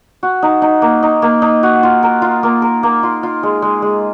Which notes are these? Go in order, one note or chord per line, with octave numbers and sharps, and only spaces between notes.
F#4
D#4
D#4
A#3
D#4
A#3
D#4
F#4
F4
A#4
F4
A#3
A#4
A#3
F4
F4
G#3
G#3
G#3